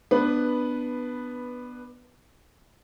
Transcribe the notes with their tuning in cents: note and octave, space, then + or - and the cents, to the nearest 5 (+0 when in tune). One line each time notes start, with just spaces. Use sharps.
B3 +0 D4 +15 B4 -5